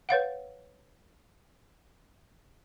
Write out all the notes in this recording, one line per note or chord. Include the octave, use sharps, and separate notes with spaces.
B4 C#5 F5 F#5